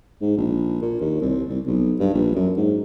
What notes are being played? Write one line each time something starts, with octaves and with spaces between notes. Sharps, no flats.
G#2
A#1
A#2
D#2
C2
C2
B1
G2
A#1
F#2
G#2